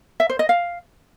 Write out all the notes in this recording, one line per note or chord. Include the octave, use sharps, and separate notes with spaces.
E5
C5
D#5
F5